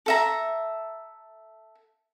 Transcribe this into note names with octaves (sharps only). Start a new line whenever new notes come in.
A4 E5 A#5